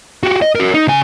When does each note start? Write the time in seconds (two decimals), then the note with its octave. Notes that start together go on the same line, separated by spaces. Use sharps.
0.23 F#4 G4
0.42 D#5
0.55 F#4 A#4
0.74 D#4
0.87 C#3 G#5